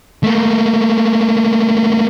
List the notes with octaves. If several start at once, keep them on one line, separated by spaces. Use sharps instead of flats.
A3 A#3